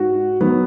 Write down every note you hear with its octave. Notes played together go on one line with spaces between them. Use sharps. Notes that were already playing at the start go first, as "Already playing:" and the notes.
Already playing: G#2 F#4
D#3 F#3 B3